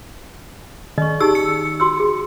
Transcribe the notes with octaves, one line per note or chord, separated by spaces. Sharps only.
D#3 D#5 C#6
D#4 G4 G#4 E6
C#7
F#4 C6 E6
G#4